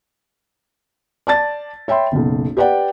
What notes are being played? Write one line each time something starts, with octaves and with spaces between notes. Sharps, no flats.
D5 A5 A6
C#5 E5 G5 B5 C6
F#1 B1
G4 B4 D5 F#5 G5